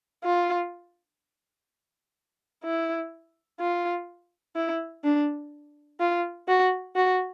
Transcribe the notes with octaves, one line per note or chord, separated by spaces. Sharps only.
F4
E4
F4
E4
D4
F4
F#4
F#4